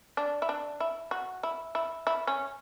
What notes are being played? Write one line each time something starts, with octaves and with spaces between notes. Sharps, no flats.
D4
E4
D4
E4
F#4
E4
E4
E4
C#4